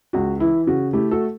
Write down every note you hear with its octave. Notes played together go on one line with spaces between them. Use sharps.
C#2 F#4
E3 E4
C#3 F#4
A3 E4 G4
F#4 A4